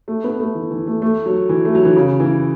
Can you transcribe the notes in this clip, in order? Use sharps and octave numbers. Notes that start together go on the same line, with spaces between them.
A3
B3
A3
E3
E3
A3
A3
F#3
E3
A3
F#3
E3
C#3
E3